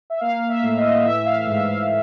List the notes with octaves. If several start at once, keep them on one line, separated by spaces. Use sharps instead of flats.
E5
A#3 F5
E5
A2
D#5
E3 E5
F5
F5
G#2 E5
F5